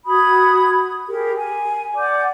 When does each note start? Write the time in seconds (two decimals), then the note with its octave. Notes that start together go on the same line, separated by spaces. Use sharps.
0.05 F#4 B5 D#6 G#6
1.07 G4 G#4 A#4
1.38 G#5
1.96 D5 F#5 D6 G6